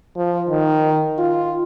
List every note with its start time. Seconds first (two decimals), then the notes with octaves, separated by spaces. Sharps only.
0.17 F3
0.49 D#3
1.19 F4